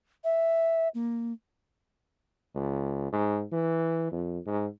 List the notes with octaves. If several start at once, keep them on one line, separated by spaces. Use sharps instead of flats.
E5
A#3
C#2
G#2
E3
F2
G#2